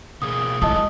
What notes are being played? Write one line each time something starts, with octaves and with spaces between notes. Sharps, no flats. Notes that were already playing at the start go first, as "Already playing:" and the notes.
B2 A#3 G#4 D#6
F#3 G#3 A3 E4 D#5 A5 D#6